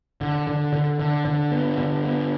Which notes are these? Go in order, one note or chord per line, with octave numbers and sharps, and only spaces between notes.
D3
D3
D3
D3
D3
B3
D3
B3